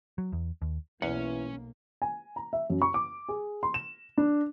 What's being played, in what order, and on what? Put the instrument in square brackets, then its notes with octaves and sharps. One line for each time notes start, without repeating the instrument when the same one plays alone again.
[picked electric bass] F#3
E2
D#2
[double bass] B1 A#3 [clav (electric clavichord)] E2 F#5 [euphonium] E3 [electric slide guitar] C#4
[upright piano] G#5
A#5
E5
F#2
C#6
D6
G#4
C6
E7
D4